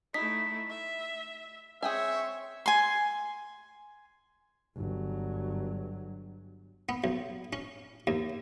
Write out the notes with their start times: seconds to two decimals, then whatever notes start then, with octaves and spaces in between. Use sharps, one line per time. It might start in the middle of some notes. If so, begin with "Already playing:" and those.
0.14 A3 D#4 E4 B6
0.70 E5
1.83 C4 G#4 C#5 E5 G5 G#5
2.66 G#5 C6
4.77 G1 F#3
6.89 B3
7.04 B1
7.53 C#4
8.07 D#2